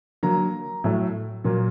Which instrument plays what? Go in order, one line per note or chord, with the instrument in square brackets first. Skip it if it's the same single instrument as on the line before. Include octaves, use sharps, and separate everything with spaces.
[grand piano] D3 F#3 A#3 A#5
A2 F#3 A3
A#2 F#3 A#3